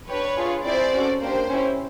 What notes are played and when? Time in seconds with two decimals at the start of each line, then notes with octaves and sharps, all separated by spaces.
0.08 D4 G4 B4 C#5
0.37 D4 F4 G#4
0.65 C4 E4 G#4 C5 D5
0.93 C#4 F#4 A4
1.21 A#3 D4 G4 C5
1.49 C#4 E4 G4